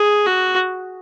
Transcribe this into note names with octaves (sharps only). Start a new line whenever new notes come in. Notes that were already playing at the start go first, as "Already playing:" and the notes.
Already playing: G#4
F#4